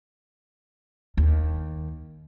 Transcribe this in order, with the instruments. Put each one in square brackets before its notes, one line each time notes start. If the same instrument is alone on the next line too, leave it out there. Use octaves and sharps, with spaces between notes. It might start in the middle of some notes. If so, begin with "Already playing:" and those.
[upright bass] D#2